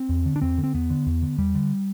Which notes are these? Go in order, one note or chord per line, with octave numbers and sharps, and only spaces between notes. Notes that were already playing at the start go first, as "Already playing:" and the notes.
Already playing: C4
E2
D3
D4
E2 C4
D3
C4
E2 B3
D3
E2
D3
E2 G3
D3